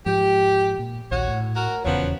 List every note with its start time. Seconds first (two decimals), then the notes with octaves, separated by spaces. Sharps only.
0.06 G#2 F3 G4
0.79 A#2
1.11 A#1 D#2 F#4 C#5
1.28 A2
1.54 F#4 A#4
1.84 D#1 E2 C#3 F3 F#3 B3